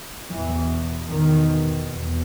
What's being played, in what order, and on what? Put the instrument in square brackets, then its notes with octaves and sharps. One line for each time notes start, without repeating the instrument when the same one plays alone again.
[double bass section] E2 B2 E3
E2 B2 D#3
E2 B2